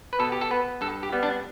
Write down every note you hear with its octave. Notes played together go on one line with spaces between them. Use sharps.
B4
B2 A4
G4
A4
B3 B4
G2 A4
G4
G3 B3
D4